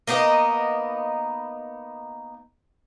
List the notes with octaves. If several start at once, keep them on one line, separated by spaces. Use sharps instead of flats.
A#3 B3 D#4 D#5